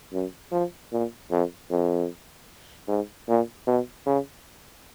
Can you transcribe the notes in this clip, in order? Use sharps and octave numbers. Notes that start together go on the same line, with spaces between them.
F#2
F3
A#2
F2
F2
G#2
A#2
B2
C#3